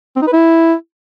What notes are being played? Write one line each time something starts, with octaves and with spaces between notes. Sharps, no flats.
C4
D#4
B4
E4